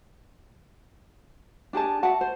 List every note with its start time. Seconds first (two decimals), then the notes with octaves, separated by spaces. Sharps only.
1.73 D4 G4 G#4 A5
2.03 F#4 E5 F#5 A5
2.21 C5